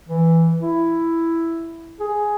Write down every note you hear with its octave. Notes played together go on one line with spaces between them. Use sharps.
E3
E4
G#4